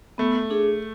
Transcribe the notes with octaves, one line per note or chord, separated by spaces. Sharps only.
A3 B3
D4 G#4